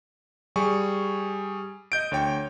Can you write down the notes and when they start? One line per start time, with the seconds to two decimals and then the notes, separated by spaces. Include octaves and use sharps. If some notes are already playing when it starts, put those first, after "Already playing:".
0.56 G3 G#4 G#5 C#6
1.92 D#5 G6 D7
2.12 D2 C#5 G5